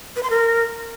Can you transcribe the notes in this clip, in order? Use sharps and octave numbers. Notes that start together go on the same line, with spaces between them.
B4
C6
A#4